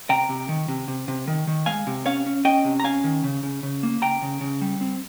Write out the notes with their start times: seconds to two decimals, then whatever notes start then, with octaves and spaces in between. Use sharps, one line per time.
0.10 C3 G5 A#5
0.29 C3
0.49 D#3
0.68 C3
0.88 C3
1.08 C3
1.28 D#3
1.47 D#3
1.66 G#3 F5 G#5
1.87 C3
2.06 C#4 C#5 F5
2.26 C#4
2.45 C#4 D#5 G5
2.64 C3
2.80 A#5
2.84 C#4 F5 G#5
3.04 D#3
3.24 C#3
3.43 C#3
3.63 C#3
3.83 A#3
4.02 C#3 G5 A#5
4.22 C#3
4.41 C#3
4.61 G3
4.81 C4